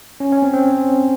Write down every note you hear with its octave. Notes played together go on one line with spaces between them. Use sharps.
C#4
C#4
C4
C4